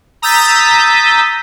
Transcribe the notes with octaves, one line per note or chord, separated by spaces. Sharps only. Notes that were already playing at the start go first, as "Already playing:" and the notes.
A#5 D#6 E6 G6 A6 B6